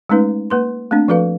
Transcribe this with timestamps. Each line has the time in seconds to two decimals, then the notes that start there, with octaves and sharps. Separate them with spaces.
0.09 G#3 A3 C#4 D#4 B4
0.50 A#3 B4 C6
0.91 A3 A#3 C4 D4
1.08 F3 F#4 A4 B4 F5